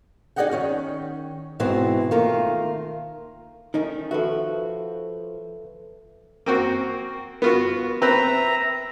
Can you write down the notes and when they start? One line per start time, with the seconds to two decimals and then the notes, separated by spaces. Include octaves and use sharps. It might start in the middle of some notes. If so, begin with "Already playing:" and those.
0.36 D#4 G#4 D5 D#5 F#5 G5
0.51 D#3 C#4 G5
1.60 G#2 B2 E3 C4
2.11 D#3 A3 A#3 F4
3.74 D#3 A3 C#4 D#4 D#5
4.11 F3 F#4 A4 B4 E5
6.46 A#3 C4 F#4
7.42 B3 F4 F#4
8.02 C4 B4 E5 A#5